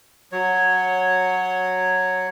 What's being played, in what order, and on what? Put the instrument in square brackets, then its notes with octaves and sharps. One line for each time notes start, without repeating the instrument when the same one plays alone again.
[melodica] F#3 C#5